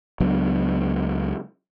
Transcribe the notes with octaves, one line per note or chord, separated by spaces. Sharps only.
C#2 F#3 B3 D4